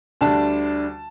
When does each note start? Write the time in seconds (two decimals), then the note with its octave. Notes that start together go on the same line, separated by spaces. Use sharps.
0.21 D2 D3 G3 D4 A5